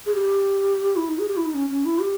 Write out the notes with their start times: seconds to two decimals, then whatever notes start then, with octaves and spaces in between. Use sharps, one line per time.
0.06 G#4
0.15 G4
0.96 E4
1.08 D#4
1.19 G#4
1.28 G4
1.37 E4
1.45 D#4
1.54 C#4
1.70 C#4
1.85 E4
2.01 G4